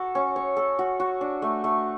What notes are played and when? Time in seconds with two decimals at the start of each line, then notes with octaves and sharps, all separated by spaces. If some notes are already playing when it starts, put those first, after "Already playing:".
Already playing: F#4 A4
0.15 C#4
0.36 C#5
0.57 A4
0.79 F#4
1.00 F#4
1.21 D4
1.42 A3
1.64 A3